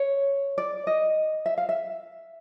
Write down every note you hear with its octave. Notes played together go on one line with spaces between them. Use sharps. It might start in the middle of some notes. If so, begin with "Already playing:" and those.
Already playing: C#5
D5
D#5
E5
F5
E5